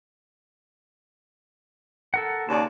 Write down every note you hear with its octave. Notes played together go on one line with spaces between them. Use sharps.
A4 A#4 F#5
D#2 C#3 D5 A5